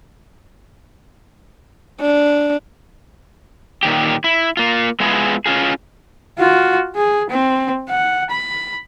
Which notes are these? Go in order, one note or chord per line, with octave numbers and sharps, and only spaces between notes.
D4
A#2 D#3 G4
E4
A#3 F4
G#3 B3 E4 F4 G#4
C#4 F4 G#4
F4 F#4
G#4
C4
F#5
B5